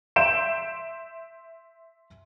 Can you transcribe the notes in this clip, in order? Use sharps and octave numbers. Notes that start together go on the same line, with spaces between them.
E5 C6 G6 D7 E7